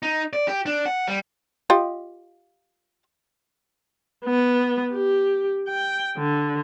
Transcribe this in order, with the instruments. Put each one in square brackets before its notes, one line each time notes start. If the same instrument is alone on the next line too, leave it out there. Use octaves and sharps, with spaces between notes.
[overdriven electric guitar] D#4
D5
G4
D4
F#5
G3
[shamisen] F4 G4 D#5
[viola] B3
G4
G5
D3